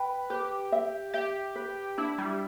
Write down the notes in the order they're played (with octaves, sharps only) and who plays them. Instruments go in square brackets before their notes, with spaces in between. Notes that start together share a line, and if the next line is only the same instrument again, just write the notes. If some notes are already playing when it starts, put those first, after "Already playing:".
Already playing: [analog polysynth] B4 [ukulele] G5
[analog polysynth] G4 [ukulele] B4
[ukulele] E5
[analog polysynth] G4 [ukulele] E5
[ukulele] B4
[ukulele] D4 [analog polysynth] E4
[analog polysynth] G3